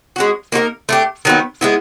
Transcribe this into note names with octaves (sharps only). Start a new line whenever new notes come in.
G#3 C#4 F#4
A#3 D#4 F#4 A#4
A3 D4 G4
D#3 F#3 B3
G#3 B3 E4